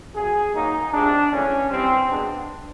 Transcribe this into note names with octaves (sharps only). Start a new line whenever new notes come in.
F#2 C#3 F#3 G#4
C#3 F#3 A#3 D#4
C3 F3 G#3 D4
E2 C#3 E3 A3 C#4
G2 E3 G3 C4
B2 G#3 B3 D4